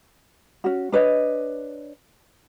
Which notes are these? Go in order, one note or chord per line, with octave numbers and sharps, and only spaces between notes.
C#4 F#4
D4 B4 C#5 D#5